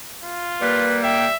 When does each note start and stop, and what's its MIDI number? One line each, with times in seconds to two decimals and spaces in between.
0.24 0.91 65
0.62 1.31 55
0.62 1.26 58
0.62 0.98 71
1.04 1.36 76
1.04 1.26 79